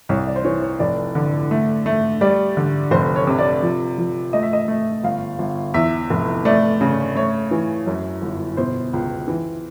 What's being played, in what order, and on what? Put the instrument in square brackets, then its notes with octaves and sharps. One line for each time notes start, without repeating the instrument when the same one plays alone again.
[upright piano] C2 C#5
D5
C5
E3 C#5
C#5
F1 D5
D3
A3
A3
G3 D5
D3
F1 C5
C#5
C3
D5
F3
F3
A3 D#5
E5
D#5
A3
G1 F5
G1
E2 E5
F1
A3 D5
C#3
A3 C#5
E3
F#2
G1
B2 C5
C#2
E3